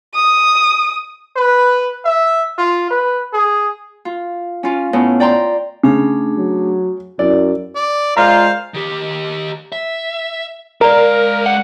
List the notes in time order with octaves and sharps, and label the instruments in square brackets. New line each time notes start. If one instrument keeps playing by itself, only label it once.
[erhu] D#6
[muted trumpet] B4
E5
F4
B4
G#4
[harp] F4
C#4 F4
A2 B3 C#4
D5 G5 A#5 C6
[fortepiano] C#3 [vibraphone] A3 D4 G#4
[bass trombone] F#3
[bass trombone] F#2 [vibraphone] E4 [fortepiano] D5
[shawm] D5
[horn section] G#3 F4 [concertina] A#4 C5 [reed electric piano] D5 A#5 [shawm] F5
[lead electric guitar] D#3 G4
E5
[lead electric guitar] G#3 F5 [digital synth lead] A#4 [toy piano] D5 A#5
[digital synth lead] F#5